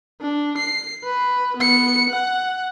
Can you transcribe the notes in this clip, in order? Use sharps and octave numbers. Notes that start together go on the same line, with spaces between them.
D4
C7
B4
B3 C#7
F#5